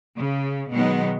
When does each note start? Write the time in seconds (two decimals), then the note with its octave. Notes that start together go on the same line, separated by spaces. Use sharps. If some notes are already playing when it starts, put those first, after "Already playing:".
0.17 C#3
0.71 B2 D#3 F#3 G#3 B3 D#4